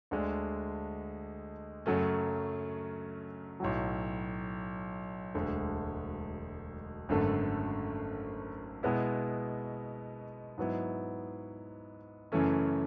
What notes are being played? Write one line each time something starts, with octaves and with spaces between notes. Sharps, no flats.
D2 D3 G#3 D4
F#2 C#3 F#3 A3 C#4
B1 A2 F#3
E1 D2 D3 G#3
G#1 F#2 D3 A3
B2 G#3 B3 E4
G#2 F#3 B3 E4
F#2 C#3 E3 A3 C#4